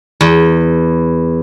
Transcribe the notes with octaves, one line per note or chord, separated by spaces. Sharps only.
E2